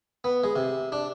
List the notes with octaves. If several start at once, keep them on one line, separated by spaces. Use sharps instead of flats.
B3
G#3
C3
D4